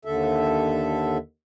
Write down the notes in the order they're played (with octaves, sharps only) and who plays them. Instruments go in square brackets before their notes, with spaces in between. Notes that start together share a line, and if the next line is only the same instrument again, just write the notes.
[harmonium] D#2 D3 A4 E5